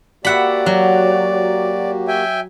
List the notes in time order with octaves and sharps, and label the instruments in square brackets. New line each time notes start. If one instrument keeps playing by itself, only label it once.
[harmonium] A#3 F#4 G4 [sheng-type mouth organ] D5 [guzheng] E5 F#5 B5
[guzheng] F#3
[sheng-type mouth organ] E5 G5 G#5